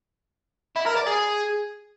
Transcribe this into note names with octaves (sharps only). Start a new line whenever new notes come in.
E4
A#4
D5
G#4